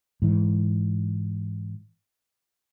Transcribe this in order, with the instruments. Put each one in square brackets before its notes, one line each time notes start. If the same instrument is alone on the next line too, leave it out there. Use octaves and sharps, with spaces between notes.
[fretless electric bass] G#2 E3